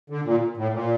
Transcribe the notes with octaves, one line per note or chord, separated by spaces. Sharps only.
D3
A#2
A2
A#2